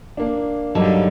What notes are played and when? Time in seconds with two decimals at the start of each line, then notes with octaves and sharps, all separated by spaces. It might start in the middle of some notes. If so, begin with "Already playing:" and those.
0.17 A#3 D4
0.75 G2 D3 F#3 D#4 A4